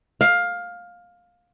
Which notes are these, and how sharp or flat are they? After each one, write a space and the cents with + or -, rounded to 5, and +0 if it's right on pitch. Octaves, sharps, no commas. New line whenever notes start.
F5 +15